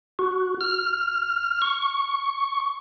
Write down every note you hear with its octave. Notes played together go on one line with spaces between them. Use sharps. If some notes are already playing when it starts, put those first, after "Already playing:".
F#4
F6
C#6